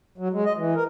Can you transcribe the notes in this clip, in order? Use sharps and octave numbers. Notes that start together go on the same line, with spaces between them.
F#3
G#3
D#5
E3
A#4